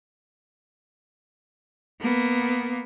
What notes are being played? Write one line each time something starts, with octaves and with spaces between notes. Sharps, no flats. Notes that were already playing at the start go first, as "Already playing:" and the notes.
A#3 B3